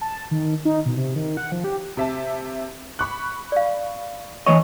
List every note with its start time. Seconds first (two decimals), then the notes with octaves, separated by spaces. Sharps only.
0.01 A5
0.31 D#3
0.65 D#4
0.86 B2
0.97 C3
1.16 D#3
1.37 F#5
1.52 F3
1.64 G4
1.97 C3 E5 A5
2.99 B5 C#6 F#6
3.52 D5 F5
4.46 E3 C#5 D#5 C#6